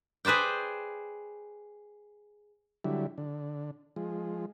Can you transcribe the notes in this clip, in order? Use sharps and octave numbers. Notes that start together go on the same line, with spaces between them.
G#4 B4 C5 D5 G5
D3 F#3 G3 E4
D3
F3 G#3